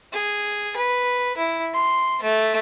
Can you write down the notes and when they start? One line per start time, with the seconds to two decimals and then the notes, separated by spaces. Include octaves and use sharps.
0.13 G#4
0.76 B4
1.37 E4
1.74 C6
2.23 A3